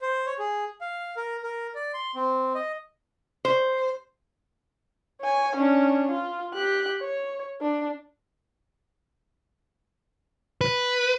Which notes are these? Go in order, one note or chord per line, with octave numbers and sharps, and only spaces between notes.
C5
C#5
G#4
F5
A#4
A#4
D5
C6
C4
D#5
C5
C#5 G#5
C#4 D4
F4
G4 F#6
C#5
D4
B4